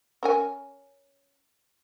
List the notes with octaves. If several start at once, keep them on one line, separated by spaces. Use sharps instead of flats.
C#4 A#4 G#5